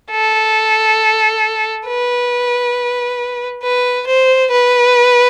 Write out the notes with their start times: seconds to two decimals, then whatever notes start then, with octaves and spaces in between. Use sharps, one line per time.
0.11 A4
1.87 B4
3.63 B4
4.07 C5
4.51 B4